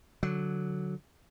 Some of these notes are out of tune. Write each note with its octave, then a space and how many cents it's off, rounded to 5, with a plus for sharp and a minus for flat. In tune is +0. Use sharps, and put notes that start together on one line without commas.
D3 +0 F#3 +0